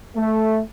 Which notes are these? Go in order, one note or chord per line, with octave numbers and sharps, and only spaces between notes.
A3